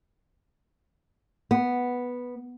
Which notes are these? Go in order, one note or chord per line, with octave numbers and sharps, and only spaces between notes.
B3